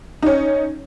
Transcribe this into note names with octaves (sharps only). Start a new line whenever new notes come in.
C#4 D#4